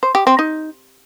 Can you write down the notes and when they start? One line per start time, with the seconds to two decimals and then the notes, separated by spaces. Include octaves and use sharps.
0.03 C5
0.15 G4
0.27 C4
0.39 D#4